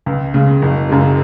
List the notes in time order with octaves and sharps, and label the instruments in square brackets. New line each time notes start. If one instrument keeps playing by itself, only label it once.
[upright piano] C#2
C#3 G#3
F#1
F#2 C#3 G#3